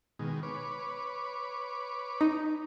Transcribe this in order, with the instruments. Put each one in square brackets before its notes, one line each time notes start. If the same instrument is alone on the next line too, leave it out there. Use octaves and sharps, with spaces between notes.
[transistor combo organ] B2 D#3 G#3
B4 C#5 D6
[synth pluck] D#4